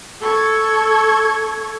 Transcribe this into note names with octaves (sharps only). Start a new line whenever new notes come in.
A4 C#6 G#6